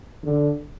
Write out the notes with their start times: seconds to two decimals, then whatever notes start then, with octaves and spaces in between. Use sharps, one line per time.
0.24 D3